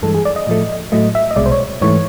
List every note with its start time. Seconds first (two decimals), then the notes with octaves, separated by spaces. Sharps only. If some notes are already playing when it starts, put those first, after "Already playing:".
0.02 G2 E3 G#3 A4
0.14 G#4
0.25 D5
0.36 D#5
0.47 A2 F3 A3
0.92 A2 F#3 A3 D#5
1.15 E5
1.31 D#5
1.36 C2 B2 G#3 D5
1.46 C5
1.51 C#5
1.82 G#2 E3 A3 C#5